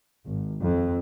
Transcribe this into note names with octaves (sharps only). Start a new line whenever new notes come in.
G#1
F2